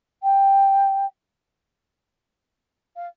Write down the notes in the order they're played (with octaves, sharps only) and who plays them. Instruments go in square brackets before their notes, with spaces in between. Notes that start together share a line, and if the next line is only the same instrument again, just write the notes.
[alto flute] G5
F5